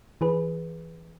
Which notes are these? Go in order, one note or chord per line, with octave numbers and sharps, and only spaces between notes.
E3 G#4 B4